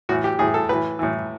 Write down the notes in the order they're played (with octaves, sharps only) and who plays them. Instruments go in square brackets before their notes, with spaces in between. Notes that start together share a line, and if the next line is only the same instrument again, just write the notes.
[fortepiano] A2 E3 F#4
G4
A2 E3 G#4
A4
A2 E3 B4
A2 E3